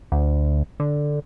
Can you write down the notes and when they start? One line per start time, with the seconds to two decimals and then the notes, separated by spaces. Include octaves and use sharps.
0.12 D2
0.80 D3